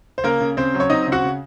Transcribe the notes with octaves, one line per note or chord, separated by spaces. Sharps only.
C5
C#3 A#3 A#4
C#3
C#3 C4 C5
F#3
C#5
C4 D#4 D#5
C#3
F#4 F#5
C#3